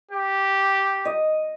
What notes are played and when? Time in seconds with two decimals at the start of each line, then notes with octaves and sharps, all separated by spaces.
0.11 G4
1.05 D#5